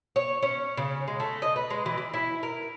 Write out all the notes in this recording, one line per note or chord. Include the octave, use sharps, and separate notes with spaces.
C#5
C#4
C#3
G#3
A3
D#5
B4
G#3
E3
E3
E4
A#4